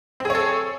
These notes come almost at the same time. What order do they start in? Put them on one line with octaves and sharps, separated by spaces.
C4 G#4 C#5 A4